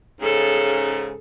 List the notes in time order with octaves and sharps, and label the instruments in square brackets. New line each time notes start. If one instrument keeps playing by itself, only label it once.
[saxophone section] G#2 C#3 [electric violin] G#4 A4